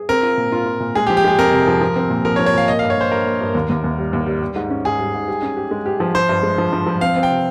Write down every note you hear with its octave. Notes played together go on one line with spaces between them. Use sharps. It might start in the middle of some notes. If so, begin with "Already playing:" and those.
Already playing: G#4
C4 A#4
F4
A#2
F4
F4
A#2
G#3 G#4
G4
F3
G4
G#3 G#4
F2 A#4
C3
F3
F3
C4
A#2
F3 A#4
C#5
F3
C#5
A#2 F5
A#3 D#5
F5
G2
C#5
A#3 C5
G2 A#4
A#3
G2
D#2
D#2
D#2
G3
D#2
G3
G3
G#2
C#4
G#2 G#4
G3
G#2
G4
C#4
G4
G#3
G4
F3
F3 C5
G2
G#3
F3
F3
F3
C4 F5
C4
G5
C3